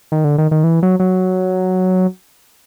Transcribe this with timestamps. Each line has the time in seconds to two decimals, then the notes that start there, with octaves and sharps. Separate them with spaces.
0.12 D#3
0.24 D3
0.38 D#3
0.51 D#3
0.64 E3
0.83 F#3
1.00 F#3